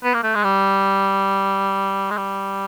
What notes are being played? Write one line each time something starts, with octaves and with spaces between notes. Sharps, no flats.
B3
A#3
A3
G#3
G3
G#3
G3